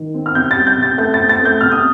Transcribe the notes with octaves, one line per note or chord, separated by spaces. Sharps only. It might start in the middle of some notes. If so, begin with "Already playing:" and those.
Already playing: D#3
C4
F6
C3 G6
A6
G3
G6
C3
A6
A3 G6
A6
C4
A6
A3
G6
C3 F6
D#6